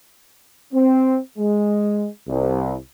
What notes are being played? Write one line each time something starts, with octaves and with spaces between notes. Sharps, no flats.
C4
G#3
C2